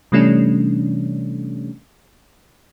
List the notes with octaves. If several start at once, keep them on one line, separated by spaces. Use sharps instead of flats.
C3 E3 G3 A3 C#4 D4